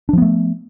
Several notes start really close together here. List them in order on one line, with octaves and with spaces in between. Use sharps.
D4 F3 B3 A3